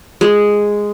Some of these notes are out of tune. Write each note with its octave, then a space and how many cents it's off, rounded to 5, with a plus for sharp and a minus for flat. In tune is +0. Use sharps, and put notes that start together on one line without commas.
G#3 -5